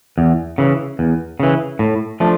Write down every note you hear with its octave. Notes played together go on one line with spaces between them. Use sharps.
E2
C#3 E3
E2
C#3 E3
A2
F3 A3 D4